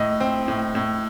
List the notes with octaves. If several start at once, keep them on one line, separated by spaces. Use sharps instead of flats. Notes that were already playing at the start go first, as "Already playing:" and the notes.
Already playing: A2 D#5
C4
A2
A2